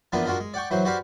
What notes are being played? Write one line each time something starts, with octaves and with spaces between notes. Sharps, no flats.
E3 F3 A#3 B3 D4 F4
G#3 D4 F4 F#4 A#4
G#3
D5 F#5 G5 C#6
E3 F#3 F#4 C5
F#4 G4 B4 C5 D5 F5